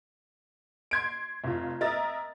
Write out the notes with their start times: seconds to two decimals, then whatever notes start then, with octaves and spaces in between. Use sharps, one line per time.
0.91 C6 G#6 D7
1.44 F1 F4
1.81 A#4 D#5 E5 A6